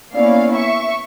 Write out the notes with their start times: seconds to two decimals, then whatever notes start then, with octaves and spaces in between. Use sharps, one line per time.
0.13 A#3 B3 C#4 E4 D5 F5
0.53 E5 C#6